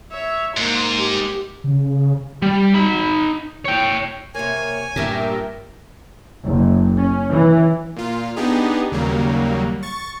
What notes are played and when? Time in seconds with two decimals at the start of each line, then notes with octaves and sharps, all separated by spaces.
0.12 C#5 E5
0.57 G#2 A#3 C6
0.98 G4
1.64 C#3
2.42 G3
2.74 D#4 B5
3.65 C#5 G5
4.35 C3 A#3 C#5 G#5
4.96 G2 A#2 A3 G4 A#4 E5 G5 A5
6.44 F#1
6.98 C#4
7.30 E3
7.96 A#2 F4
8.36 B3 D4 D#4 G4 G#4
8.91 D#2 C#3 F#3 G3 A#3
9.83 C#6 A6